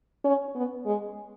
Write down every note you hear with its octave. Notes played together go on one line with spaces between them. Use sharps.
C#4
B3
G#3